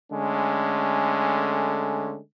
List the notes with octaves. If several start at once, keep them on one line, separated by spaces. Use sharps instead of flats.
D3 G#3 A3 C#4